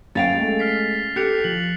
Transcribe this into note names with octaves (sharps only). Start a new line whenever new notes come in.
F#2 C#4 F5 G5 A6 F7
G#3 A3
F6 B6 C7
G4 A4 F#6 C#7 F7
F3 F#7